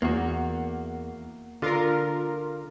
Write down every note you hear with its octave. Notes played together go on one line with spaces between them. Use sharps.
E2 A#3 F#4
D3 F4 A#4